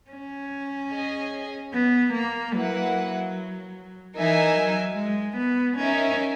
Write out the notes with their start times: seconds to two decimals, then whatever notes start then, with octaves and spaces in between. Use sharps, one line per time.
0.11 C#4
0.91 G#4 D#5 G#5
1.73 B3
2.14 A#3
2.54 F#3 A#3 E4 B4 F#5
4.15 E3 D#4 A#4 E5 G#5
4.57 F#3
4.97 G#3
5.37 B3
5.78 C#4 D#4 A#4 E5